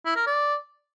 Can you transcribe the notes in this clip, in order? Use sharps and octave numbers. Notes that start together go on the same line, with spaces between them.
E4
A#4
D5